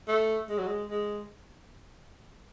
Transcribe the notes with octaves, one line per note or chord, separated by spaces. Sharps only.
A3
G#3
F#3
G#3
G#3